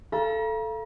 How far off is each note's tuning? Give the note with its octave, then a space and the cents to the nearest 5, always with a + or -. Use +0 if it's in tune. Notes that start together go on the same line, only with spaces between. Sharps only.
A4 +0 F5 -30 A#5 +40